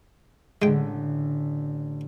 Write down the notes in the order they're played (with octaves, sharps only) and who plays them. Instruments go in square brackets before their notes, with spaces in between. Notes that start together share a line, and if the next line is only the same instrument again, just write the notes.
[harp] A1 D3 [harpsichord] G#3 G5